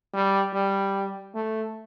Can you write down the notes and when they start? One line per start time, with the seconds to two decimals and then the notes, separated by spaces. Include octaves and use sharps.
0.14 G3
0.54 G3
1.35 A3